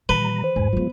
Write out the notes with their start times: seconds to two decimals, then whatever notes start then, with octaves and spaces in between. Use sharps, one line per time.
0.09 A#2 D#3 E3 G3 B4 A#5 G7
0.44 C5
0.56 E2 G#2 G#3 G#5
0.73 E3 F#3 G#3 B3 F4